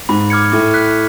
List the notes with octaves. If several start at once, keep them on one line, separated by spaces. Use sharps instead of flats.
G#2 B5
D6 F6 G#6 C#7
A2 D6
F#6 B6